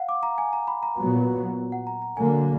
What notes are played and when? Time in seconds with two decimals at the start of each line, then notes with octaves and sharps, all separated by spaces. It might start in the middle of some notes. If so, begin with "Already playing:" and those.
Already playing: F5 F#5
0.09 D6
0.23 A#5
0.38 G#5
0.53 A#5
0.68 B5
0.83 A#5
0.98 A#2 F#3 B3
1.72 F#5
1.87 A#5
2.02 A#5
2.17 D3 F#3 A#3 G#5